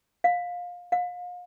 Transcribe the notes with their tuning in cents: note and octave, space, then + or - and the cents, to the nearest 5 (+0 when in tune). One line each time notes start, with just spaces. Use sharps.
F5 +20
F5 +35